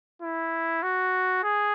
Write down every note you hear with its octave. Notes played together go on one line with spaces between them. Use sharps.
E4
F#4
G#4